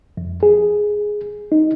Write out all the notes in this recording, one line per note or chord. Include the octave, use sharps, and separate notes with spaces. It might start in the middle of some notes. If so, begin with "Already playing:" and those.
F2
G#4
D#4